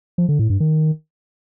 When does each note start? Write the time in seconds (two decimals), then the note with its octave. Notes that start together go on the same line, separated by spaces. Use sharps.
0.18 F3
0.29 D3
0.39 A2
0.50 G2
0.60 D#3